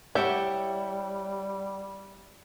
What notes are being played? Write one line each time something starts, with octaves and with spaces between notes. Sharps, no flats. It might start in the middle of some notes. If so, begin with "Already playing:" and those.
G3 E4 G4 C#5 D5 E5 F#5